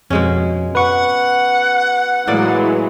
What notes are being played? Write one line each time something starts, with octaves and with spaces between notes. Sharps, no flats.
F2 B2 G#3 C#4
B4 F#5 C#6
A2 E3 F#3 G#3 A#3 D5